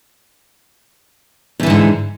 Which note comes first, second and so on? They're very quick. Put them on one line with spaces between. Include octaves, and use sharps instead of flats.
E2 E3 D3 G#2